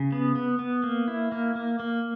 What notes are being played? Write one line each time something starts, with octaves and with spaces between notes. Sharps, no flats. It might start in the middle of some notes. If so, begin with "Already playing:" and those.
Already playing: C#3
B3
B3
B3
A#3
E4
A#3
A#3
A#3